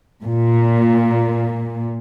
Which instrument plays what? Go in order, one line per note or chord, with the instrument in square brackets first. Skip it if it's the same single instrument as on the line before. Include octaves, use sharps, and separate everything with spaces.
[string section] A#2